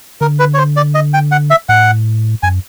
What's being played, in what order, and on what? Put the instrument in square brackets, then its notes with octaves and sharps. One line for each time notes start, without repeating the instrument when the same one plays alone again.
[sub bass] D3 [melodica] A#4
[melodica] B4
C#5
C5
D5
D#5
G5
F#5
E5
[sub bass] A2 [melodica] F#5
[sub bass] F#2 [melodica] G#5